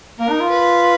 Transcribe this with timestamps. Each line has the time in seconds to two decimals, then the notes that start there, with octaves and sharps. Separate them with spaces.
0.19 A#3 A#4
0.30 D#4
0.40 F4
0.50 B4